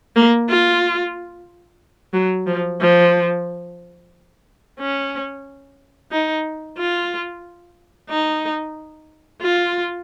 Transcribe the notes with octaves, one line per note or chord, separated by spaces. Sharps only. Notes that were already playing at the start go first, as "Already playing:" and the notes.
A#3
F4
F#3
F3
F3
C#4
D#4
F4
D#4
F4